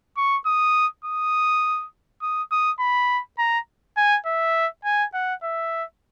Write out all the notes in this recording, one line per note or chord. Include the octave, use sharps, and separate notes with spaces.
C#6
D#6
D#6
D#6
D#6
B5
A#5
G#5
E5
G#5
F#5
E5